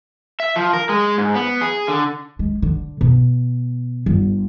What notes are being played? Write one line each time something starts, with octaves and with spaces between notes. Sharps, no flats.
E5
F3
A#4
G#3
G#2
B3
G#4
D3
G#3
D3
B2
G1